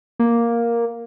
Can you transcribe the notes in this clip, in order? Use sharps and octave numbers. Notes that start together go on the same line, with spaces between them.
A#3